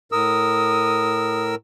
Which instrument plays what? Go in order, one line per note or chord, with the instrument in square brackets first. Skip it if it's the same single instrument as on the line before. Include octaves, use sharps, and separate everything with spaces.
[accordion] A2 A#4 E6 [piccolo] D#6